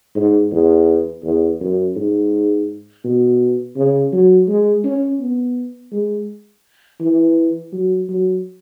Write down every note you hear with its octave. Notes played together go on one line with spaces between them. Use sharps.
G#2
E2
E2
F#2
G#2
B2
C#3
F#3
G#3
C#4
B3
G#3
E3
F#3
F#3